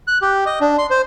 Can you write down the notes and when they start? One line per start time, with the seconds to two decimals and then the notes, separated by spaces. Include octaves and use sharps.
0.07 F#6
0.22 G4
0.46 D#5
0.61 D4
0.78 C6
0.90 C5